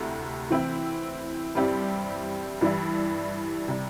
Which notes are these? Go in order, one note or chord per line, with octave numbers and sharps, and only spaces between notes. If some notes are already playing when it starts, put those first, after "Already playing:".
Already playing: D2 C3 A3 E4
E3 C4 E4
G2 G3 C4 E4 G4
G2 E3 G3 E4
C3 G3